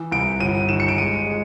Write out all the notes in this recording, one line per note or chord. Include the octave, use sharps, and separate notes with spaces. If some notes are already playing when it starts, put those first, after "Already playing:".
Already playing: E3
C2 D7
G1 D#7
D#3 E7
C#7
D7
G#3 D#7
G#3